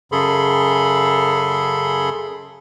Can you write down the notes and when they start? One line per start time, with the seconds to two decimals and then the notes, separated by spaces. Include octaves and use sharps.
0.12 F#2 C#3 G#4 A4 B5 C6